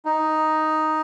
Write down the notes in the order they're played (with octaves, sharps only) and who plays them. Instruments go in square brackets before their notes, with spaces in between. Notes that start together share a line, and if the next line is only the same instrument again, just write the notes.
[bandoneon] D#4